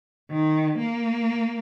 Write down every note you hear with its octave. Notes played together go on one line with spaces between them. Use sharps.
D#3
A#3